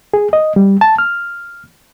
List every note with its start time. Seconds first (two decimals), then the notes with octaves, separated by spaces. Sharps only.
0.14 G#4
0.33 D#5
0.56 G3
0.81 A5
0.98 F6